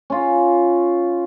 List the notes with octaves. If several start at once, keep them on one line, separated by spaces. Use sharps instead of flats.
C#4 F4